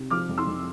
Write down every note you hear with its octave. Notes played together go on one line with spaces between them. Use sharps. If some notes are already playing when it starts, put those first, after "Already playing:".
Already playing: C3
F3 D6 F6
F2
C6 E6
F2